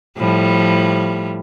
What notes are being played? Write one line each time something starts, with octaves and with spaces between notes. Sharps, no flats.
A2 F3 G3